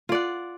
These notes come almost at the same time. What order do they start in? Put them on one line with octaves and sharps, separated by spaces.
F4 D5 F#5